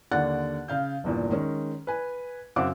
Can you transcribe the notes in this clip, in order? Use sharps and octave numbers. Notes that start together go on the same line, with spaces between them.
D#2 D3 D5 F#5 F#6 A6
C#3 F5 G6
G1 E2 A#2
D#3 G#3 C#4
B4 G#5
F#2 C#3 C4 F#5 D6